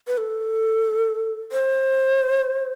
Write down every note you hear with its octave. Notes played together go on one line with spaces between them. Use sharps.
B4
A4
C5